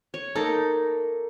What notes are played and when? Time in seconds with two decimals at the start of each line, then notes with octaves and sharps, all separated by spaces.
0.14 C#5
0.35 A#3 D#4 A4